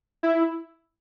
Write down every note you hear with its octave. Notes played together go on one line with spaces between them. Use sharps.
E4